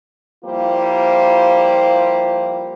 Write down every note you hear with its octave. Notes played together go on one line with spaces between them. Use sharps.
F3 G3 A#3 E4 F4 C5